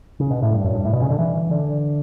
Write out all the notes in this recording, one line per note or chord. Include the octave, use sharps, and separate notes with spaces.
C#3
B2
A2
G2
F#2
G2
A2
B2
C#3
D3
E3
D3